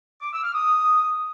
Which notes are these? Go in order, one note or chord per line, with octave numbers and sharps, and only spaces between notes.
D6
E6
F6
D#6